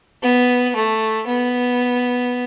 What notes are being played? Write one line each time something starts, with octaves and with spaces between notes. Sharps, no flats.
B3
A3
B3